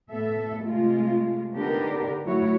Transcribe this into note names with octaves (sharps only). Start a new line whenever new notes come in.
A2 B3 A4 E5
C3 G#3 A3 F4
D3 B3 D4 D#4 G4 A#4
F#3 A3 E4 F#4 C#5